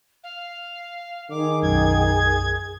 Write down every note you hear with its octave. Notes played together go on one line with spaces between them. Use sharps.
F5
D#3 G#4 D6
B1 F#2 G#6